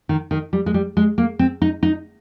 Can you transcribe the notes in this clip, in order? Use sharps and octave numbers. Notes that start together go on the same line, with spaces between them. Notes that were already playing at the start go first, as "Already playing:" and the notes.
D#3
D#3
G3
G#3
G3
G#3
A#3
C4
D#4
D#4